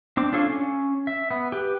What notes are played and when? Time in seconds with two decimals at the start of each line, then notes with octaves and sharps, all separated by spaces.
0.17 C4 D4 D6
0.33 D4 F4 A4 C#5 F5
0.50 C#4
1.07 E5
1.31 B3
1.52 G4 B4